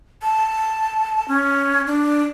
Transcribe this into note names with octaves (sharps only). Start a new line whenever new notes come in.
A5
C#4
D4